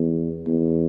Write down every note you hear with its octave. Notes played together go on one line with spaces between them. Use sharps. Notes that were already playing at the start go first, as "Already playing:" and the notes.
Already playing: E2
E2